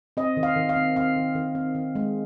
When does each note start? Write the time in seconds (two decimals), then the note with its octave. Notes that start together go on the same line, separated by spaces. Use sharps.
0.17 C4 D#5
0.37 D#3
0.43 F5
0.56 D#3
0.69 F5
0.76 C4
0.96 C4 F5
1.16 D#3
1.35 D#3
1.55 C4
1.75 D#3
1.95 G#3